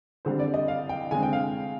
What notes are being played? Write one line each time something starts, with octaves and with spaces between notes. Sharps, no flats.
D3 G3 C4 C5
D5
D#5
F5
G5
D3 G#3 C4 G#5
G5
F5